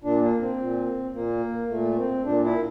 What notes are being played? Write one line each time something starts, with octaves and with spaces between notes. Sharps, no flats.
A#2 D4
A#3
C4
A#2
A#2 A#3
A#2 A3
C4
A#2 D4
E4